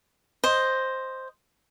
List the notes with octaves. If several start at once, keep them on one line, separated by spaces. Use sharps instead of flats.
C5 D#5